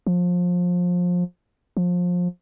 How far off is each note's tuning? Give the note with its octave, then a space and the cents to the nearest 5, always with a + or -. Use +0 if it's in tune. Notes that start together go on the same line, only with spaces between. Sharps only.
F3 +25
F3 +25